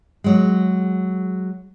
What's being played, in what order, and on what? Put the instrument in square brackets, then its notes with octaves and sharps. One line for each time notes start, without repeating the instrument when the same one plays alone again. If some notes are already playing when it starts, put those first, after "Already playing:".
[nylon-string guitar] F#3 G#3